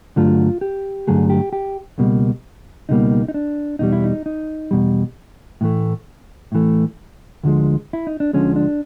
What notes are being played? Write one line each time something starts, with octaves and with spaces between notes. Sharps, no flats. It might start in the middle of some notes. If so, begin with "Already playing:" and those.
G2 D3 F#3 A3 F4
G4
G2 D3 F#3 A3 G#4
G4
G4
C#2 B2 G3 A#3
C#2 B2 G3 A#3 D#4
D#4
D4
E2 B2 G3 D#4
E4
D#4
D#4
E2 B2 G3
A2 E3 A3
A2 E3 A3
D2 D3 F3 G#3
E4
D#4
D4
D2 D3 F3 G#3 C#4
D4